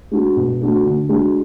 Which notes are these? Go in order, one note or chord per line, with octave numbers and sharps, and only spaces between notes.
G#3 D4 F#4
B2
A3 D4 F#4
D3
G#3 D4 F#4